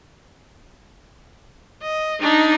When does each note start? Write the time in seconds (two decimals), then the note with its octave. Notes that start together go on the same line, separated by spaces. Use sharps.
1.82 D#5
2.20 D4 D#4